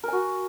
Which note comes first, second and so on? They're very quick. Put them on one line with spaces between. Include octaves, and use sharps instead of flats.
A#4 G#5 F#4